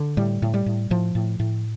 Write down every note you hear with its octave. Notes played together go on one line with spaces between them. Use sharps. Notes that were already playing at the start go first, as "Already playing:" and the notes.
Already playing: D3
A2 G3
A2
G3
A2
A2 F3
A2
A2